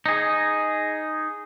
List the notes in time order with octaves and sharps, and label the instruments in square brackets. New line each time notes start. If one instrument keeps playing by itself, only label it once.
[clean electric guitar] D#4 G#4